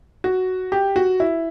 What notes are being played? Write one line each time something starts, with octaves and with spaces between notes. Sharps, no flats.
F#4
G4
F#4
E4